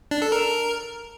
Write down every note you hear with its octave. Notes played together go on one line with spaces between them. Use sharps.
D4
A4
A#4